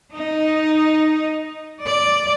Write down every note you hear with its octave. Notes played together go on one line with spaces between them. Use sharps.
D#4
D5